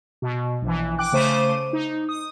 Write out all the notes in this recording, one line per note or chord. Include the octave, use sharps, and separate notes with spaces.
B2
A#1 E3
G5 D6 F#6
C#3 A3 C5 D6 D#7
D#4
D#6